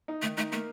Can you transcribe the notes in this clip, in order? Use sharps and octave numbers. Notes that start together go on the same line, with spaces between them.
D#4
D#3 A3
A3 D#4
A3 A#3